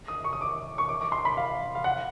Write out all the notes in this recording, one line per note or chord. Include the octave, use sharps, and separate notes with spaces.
D#6
C#6
D#6
D6
C#6
D6
D6
C6
B5
F5
F5
F#5